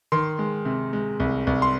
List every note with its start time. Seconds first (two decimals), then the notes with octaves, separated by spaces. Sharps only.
0.12 D#3 C6
0.39 G#3
0.65 C3
0.93 G#3
1.20 C2
1.47 C2
1.62 C6